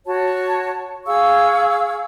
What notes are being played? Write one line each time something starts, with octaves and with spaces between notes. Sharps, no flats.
F#4 C#5 A5
G#4 F5 C#6 E6